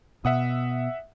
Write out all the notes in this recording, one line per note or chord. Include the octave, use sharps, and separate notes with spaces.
B2 E5 F#5 D#6